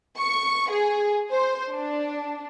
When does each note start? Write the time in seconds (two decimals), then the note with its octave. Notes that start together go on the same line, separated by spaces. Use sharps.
0.17 C#6
0.70 G#4
1.30 C5
1.71 D4